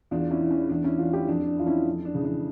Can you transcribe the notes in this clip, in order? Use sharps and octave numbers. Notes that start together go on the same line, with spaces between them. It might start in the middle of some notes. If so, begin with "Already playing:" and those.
E2 D4 F4
C#4 E4
E3
C#4
E2 D4
C#4 E4
E3 D4 F4
E4 G4
F2 D4
D4
E3 F4
C#4 E4
F2
D4
C#3 E3
D4